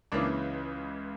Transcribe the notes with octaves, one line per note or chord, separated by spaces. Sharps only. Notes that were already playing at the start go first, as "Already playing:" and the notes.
C#2 C#3 E3 A#3 D4